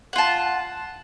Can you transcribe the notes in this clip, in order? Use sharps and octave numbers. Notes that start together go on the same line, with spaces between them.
F4 F#5 A5